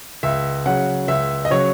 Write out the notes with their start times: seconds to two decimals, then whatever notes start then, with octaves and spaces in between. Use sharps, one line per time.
0.23 C#2 E5
0.66 C#3 F#3 F#5
1.08 C#2 E5
1.45 D#5
1.50 C#3 F#3 C#5